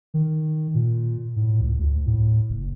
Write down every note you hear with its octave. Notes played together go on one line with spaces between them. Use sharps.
D#3
A#2
A2
C#2
D2
A2
F#1